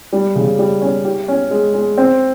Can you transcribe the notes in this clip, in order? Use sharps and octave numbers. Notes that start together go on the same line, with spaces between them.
G3
C#3
G3
C#4
G4
C#4
G#3
G#3
C4